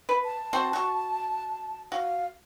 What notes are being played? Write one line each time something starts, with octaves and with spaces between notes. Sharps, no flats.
B4
A5
C4 F#4 C5
F#4 C#6
F#4 F5